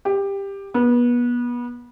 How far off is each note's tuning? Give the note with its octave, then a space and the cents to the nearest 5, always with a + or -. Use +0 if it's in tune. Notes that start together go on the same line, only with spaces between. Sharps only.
G4 +15
B3 -30